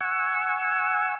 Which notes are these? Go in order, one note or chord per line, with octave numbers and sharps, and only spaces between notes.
F#5 G#5 C#6 E6